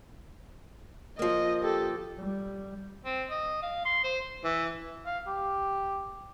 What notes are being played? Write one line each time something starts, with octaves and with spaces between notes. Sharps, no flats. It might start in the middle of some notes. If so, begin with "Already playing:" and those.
F3 A#3 D#5
G4 A4
G3
C4
D#5
F5
C6
C5
E3
F5
G4